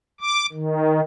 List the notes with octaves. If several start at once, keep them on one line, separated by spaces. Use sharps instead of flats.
D6
D#3